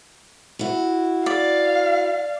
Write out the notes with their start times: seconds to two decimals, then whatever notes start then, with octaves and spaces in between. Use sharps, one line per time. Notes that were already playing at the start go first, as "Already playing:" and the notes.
0.59 E4 F#4
1.26 D5 F5